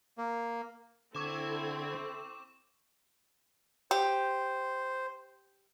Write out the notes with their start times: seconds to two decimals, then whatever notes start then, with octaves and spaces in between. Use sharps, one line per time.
0.18 A#3
1.15 D3 C4 E4 A4 C#6 D6 G#6 E7
3.91 G4 C5